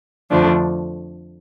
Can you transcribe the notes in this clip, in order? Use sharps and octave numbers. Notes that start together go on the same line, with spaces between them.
F2 D3 F3 A3 D4